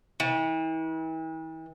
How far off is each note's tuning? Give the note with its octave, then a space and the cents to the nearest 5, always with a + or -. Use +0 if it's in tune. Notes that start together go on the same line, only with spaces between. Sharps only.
E3 -40